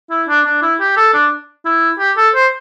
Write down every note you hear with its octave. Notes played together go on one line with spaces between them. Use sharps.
E4
D4
D4
E4
G4
A4
D4
E4
G4
A4
C5